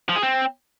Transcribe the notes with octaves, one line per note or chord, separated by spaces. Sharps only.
F3
G#4
C4